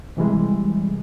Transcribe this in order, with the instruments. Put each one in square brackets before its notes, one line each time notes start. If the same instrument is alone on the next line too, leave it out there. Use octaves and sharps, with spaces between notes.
[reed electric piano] C3 E3 G3 G#3